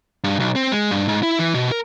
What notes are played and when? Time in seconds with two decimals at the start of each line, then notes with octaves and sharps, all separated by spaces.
0.24 G2
0.40 B1
0.56 C4
0.72 G#3
0.91 G2
1.08 G#2
1.23 E4
1.39 E3
1.54 B2
1.72 A#4